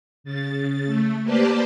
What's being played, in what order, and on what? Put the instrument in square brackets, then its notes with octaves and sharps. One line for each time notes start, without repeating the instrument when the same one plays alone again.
[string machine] C#3 A6
A3
A#3 G4 B4 C5 D5 A5